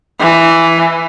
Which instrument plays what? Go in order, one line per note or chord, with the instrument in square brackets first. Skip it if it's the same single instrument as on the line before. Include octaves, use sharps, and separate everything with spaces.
[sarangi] E3